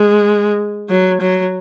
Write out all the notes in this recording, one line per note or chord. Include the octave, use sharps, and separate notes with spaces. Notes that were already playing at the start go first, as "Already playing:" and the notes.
Already playing: G#3
F#3
F#3